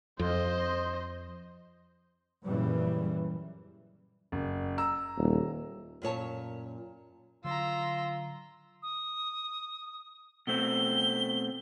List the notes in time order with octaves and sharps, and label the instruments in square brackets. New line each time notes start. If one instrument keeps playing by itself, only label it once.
[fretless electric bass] F2 [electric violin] C5 D#5
[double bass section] F#2 A#2 C#3 E3 G3
[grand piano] F#1
A#5 E6
[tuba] D#1
[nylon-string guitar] F#2 A#2 C#5 A5
[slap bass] D3 F#3 [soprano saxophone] F4 [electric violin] A#5 E6 [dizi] C6
[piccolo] D#6
[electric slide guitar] B2 A3 C4 [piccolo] G7